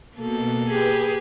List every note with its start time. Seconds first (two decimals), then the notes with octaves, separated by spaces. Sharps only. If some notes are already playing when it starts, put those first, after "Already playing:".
0.17 B2 A#3 A4
0.69 G4 G#4 B4